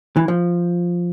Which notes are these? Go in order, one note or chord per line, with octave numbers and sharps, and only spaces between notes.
E3
F3